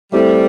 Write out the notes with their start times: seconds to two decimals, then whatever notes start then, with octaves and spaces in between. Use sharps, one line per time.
0.12 G3 A3 C4 E4 A4 C5